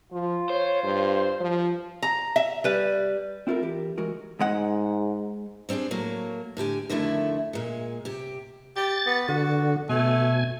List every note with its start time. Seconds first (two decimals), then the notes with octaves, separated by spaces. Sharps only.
0.12 F3 F4
0.50 C5 C#5
0.83 G2
1.40 F3
2.03 A#5
2.36 E5
2.64 G3 B4
3.47 C4 E4 F4 A4 A#4
3.62 E3 G4 A#4
3.98 E3 G#3 F#4 A#4
4.40 G#2 G#3 F#5
5.69 G3 C4 D4 F4 G#4
5.91 A2 F#3 A#3
6.57 A2 D3 G4 G#5
6.90 F2 D3 D#3 A3 E4
7.53 A#2 G#3
8.05 C3 G4
8.76 G4 A6
9.06 B3
9.28 D3 F#4
9.89 B2 A3 G#5